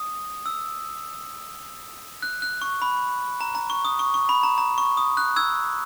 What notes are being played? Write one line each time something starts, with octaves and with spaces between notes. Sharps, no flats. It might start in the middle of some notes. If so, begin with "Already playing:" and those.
Already playing: D#6
E6
F#6
F#6
C#6
B5
A#5
A#5
C#6
D#6
C#6
C#6
B5
A#5
A#5
C#6
D#6
F#6
E6 G#6